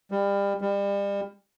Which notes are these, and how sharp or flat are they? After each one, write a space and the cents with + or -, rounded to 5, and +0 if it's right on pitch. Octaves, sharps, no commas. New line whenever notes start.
G3 +30
G3 +35